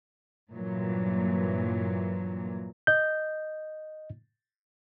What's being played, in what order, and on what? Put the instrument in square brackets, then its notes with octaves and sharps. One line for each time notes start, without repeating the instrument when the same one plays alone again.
[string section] G2 A#2 E3 F#3
[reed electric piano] D#5 G6